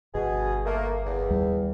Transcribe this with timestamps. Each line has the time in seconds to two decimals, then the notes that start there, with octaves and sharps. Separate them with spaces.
0.15 G1 B2 G#4
0.66 A3 A#3
1.06 E2
1.30 D#2 G3